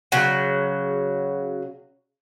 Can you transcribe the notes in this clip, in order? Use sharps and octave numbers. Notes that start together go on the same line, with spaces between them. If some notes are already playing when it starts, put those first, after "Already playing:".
C#3 F#3